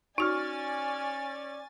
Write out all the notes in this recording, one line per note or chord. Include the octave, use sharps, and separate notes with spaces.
C#4 D#4 F#4 D5 G#5 C#6 F6 A6